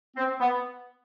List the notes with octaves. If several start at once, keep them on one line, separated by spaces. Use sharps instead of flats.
C4
B3